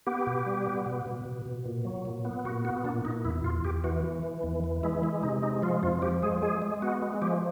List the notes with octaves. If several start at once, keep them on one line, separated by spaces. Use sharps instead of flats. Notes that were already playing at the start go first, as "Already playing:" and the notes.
B3 G4
B2
G3
B3
B2
B2
B2
B2
A#2
F#3
A#2
B3
A#2 F#4
B3 F#4
A#2 D4
A#2 D#4
E2 E4
E2 F4
E2 G4
E3 F#4
E3
E3
E2
E3
G#3 E4
G#3 E4
C3 D#4
G#3 D#4
F3 F4
F2 F4
F3 G4
G#3 G#4
G#3 G#4
G#3
B3 F#4
G#3
F3 G4